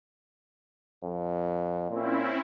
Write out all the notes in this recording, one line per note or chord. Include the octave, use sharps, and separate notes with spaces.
F2
A#2 C4 C#4 E4